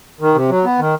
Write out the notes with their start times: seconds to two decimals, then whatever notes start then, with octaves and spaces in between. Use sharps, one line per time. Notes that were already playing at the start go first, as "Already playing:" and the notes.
0.21 D#3
0.34 C3
0.49 F#3
0.64 B3
0.79 D#3